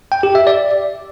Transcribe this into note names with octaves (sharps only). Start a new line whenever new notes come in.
G5
G4
E5
D5